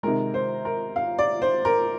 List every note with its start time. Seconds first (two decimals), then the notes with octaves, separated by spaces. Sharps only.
0.03 C3 D#3 G#3 A#4
0.34 C5
0.65 A#4
0.96 F5
1.19 D5
1.42 C5
1.65 A#4